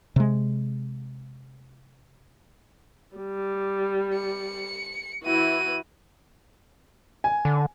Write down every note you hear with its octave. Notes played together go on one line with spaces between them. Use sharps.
C3 G#3
G3
C#7
E3 E4 F#4 D#7
G#5
D3